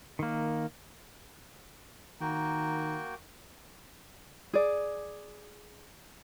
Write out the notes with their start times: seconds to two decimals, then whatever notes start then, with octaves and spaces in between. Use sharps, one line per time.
0.19 D#3 A#3
2.21 D#3 A#3 F#4 G5 A#5
4.53 G#4 D5